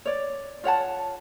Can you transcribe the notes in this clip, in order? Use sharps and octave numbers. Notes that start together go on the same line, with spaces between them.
C#5 D5
F4 C#5 F#5 A5